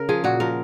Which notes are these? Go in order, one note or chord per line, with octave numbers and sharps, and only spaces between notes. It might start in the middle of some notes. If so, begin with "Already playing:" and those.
Already playing: C#3 A#4
F3 G#4
A#2 F#4
F3 A#4